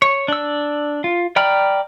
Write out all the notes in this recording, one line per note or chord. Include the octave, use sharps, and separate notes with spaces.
C#5
D4 E6
F4
D5 G5 A#5 B5 F6